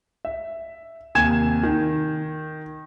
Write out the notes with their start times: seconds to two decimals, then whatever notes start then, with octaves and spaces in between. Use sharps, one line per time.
0.25 E5
1.15 D#2 C3 G#5 G#6 E7
1.63 D#3